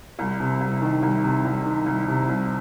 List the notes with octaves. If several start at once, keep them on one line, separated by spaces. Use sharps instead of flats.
C2
C3
C2
D#3
C2
C3
C2
D#3
C2
C3
C2